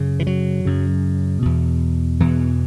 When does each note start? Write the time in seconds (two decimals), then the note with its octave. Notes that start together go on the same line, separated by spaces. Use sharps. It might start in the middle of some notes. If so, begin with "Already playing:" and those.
Already playing: F#2 C#3
0.19 E3
0.27 F#3
0.65 F#2 C#3
1.42 E2 B2
2.20 E2 B2 E3